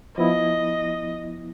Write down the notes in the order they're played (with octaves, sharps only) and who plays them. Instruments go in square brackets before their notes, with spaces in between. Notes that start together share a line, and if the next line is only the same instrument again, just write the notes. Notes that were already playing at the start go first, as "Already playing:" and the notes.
[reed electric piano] F3 B3 E4 [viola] D#5